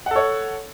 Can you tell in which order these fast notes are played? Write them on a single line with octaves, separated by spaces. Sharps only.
F#5 A4 C#5